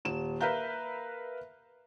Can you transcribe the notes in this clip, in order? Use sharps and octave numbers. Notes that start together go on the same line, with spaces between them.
D#1 E7
A#4 B4 E5 F5 A#5 G6